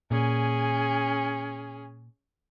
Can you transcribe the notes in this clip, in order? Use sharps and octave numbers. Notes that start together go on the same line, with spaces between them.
A#2 C#4 G#4